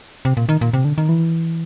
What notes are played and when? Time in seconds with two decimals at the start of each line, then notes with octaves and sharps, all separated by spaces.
0.25 C3
0.37 A#2
0.49 D#3
0.61 A#2
0.74 C3
0.85 D3
0.98 D#3
1.09 E3